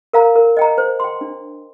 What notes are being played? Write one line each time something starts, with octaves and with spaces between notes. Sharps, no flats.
A#4 F5 A#5
A#4
D#5 G5 A#5
C5
G5 C6
D4